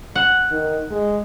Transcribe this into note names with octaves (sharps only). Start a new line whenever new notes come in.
F#5
D#3
G#3